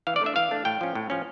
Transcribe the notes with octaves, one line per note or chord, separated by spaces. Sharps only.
E3 F5
D5
A3 D4 E5
E3 F5
A3 D4
A2 G5
F3 C#4
A2
F3 C#4